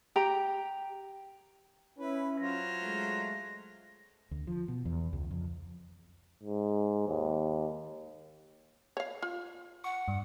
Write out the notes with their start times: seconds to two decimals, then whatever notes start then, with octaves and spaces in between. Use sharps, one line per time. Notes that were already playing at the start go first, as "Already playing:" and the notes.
0.16 G4 G5 A#5
1.98 C#4 E4 B4
2.39 F#3 F4 C5 A#6
2.83 G#3 A3
4.31 D2
4.47 F3
4.68 B2
4.85 E2
5.13 C#2
5.31 F2
6.43 G#2
7.07 D#2
8.97 C#5 F5
9.22 F4
9.84 F#5 C#6
10.08 G2